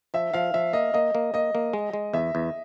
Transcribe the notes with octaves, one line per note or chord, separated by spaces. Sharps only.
F3 E5
F3 F5
F3 E5
A#3 D#5
A#3 D#5
A#3
A#3 D#5
A#3
G#3
G#3
E2 E5
E2